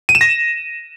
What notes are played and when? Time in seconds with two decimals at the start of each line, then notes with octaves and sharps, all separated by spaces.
0.09 D#7
0.15 E7
0.21 A#6